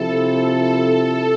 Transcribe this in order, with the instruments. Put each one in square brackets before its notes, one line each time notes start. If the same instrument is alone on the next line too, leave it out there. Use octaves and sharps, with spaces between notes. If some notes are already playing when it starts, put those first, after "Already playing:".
Already playing: [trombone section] C3 F3 C4 E4 [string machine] A4
[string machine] A4
A4